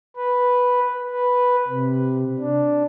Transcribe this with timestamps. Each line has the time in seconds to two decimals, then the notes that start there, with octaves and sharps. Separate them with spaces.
0.16 B4
1.11 B4
1.68 C3
2.39 D4